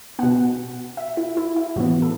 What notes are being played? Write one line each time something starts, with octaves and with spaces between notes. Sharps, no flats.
B2 B3 F#5
E5
E4
E4
E4
A2 E3 B3 F#4
A4